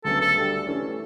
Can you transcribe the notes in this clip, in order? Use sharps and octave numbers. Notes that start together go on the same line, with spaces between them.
D2 C#3 F#3 B3 A4
A4
D2 D3 G3
E3 A3 C#4